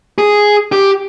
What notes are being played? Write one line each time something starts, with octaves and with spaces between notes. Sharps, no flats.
G#4
G4